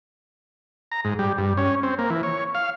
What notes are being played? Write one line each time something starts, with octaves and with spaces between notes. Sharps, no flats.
A#5
G#2
G3
G2
C#4
C4
A#3
E3
C#5
F5